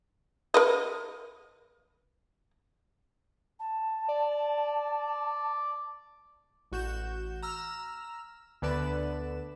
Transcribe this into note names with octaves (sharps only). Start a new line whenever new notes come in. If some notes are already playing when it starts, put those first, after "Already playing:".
A#4 B4 D#5
A5
D5
A1 F#4 G6 E7
A#5 E6 F6
D2 D3 B3 B4 D5 E7